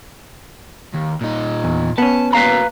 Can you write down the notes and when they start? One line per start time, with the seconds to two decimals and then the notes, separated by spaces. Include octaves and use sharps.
0.94 D#2
1.21 A#2 D#4
1.64 E2
1.98 B3 C#4 A5
2.33 A#3 F#4 B4 F5 A#5